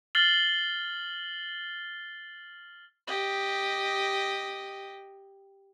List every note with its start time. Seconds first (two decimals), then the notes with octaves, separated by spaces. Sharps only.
0.15 F6 A6 C7 F#7 G7
3.07 G4 D#5